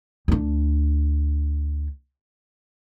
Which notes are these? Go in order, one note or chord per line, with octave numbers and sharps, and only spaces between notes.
D2 D4